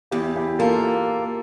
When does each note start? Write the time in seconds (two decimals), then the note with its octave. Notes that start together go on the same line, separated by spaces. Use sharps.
0.11 E2 E4 G4
0.36 E4 G4
0.59 A#3 F4 A4